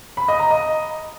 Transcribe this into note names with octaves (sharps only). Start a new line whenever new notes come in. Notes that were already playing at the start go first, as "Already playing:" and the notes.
B5
D#5
A#5
D#5